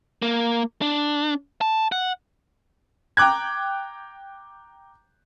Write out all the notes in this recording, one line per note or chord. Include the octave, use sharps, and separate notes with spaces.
A#3
D4
A5
F#5
G5 A#5 D6 F#6 G#6